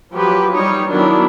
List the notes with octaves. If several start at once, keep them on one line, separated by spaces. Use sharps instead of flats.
F3 F#3 G4 B4
G3 D#4 C#5
D#3 F#3 B3 D4 E4